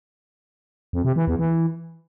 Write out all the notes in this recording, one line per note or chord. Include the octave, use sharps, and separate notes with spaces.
F2
C3
E3
E2
E3